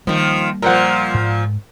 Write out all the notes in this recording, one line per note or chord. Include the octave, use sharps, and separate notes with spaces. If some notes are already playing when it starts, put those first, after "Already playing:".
D#3 F3 G3 A#3
A#2 F3 A#4 C5 F#5
G#2